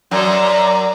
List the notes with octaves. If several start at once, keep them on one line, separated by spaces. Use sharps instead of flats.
F#2 D5 A#5